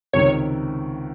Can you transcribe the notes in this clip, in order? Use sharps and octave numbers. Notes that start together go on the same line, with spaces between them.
C#2 C3 D#3 C#5